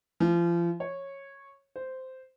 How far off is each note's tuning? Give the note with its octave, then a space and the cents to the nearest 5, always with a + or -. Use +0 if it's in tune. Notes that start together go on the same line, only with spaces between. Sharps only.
F3 -35
C#5 -10
C5 -10